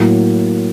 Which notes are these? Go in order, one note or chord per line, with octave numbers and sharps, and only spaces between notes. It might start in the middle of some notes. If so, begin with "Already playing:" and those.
Already playing: A2 F#3 A#3